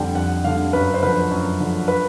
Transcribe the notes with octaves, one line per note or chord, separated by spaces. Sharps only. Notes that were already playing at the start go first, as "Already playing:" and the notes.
Already playing: F2 D3 G3 G5
F2 F#5
D3 G3 F5
F#2 B4
C5
D3 F3 B4
F#2
D3 F3
B4